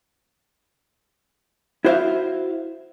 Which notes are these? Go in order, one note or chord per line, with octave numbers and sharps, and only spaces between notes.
E4 F#4 C5 D5 E5 F5